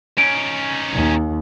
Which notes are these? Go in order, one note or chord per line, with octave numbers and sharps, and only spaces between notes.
C#4 D#4 D7
D#2